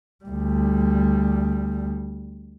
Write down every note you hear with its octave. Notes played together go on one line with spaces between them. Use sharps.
D2 G3